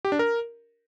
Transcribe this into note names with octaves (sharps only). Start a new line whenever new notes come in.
G4
D4
A#4